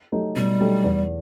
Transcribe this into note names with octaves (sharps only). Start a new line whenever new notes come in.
F#3 A3 D#4 G4
B2 G3
F#3 A3 D#4 G4
E2